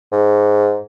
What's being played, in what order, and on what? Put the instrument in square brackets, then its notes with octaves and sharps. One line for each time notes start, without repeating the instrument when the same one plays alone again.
[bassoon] G#2